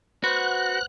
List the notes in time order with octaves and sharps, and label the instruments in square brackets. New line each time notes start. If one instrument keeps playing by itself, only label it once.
[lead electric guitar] F#4 [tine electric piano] B4 C5 F#5 [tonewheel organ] F#6